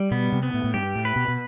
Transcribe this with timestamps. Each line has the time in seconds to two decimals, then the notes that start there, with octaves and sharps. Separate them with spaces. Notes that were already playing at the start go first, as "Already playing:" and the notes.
Already playing: G3
0.11 B2 B3
0.32 C3
0.43 B3
0.54 A2
0.64 A2
0.74 G2 G4
0.95 A2
1.05 B4
1.16 B2
1.28 B2